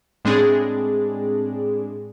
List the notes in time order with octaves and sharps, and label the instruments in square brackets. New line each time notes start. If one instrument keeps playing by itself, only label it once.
[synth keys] A2 G#3 C4 D4 G#4